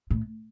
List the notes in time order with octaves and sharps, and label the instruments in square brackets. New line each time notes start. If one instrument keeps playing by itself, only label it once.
[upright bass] A2